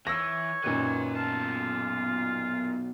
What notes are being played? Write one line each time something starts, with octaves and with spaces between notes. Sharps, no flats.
E3 C#5 E6 A#6
F#2 A#2 D#3 B4 C6
B1 F4 A5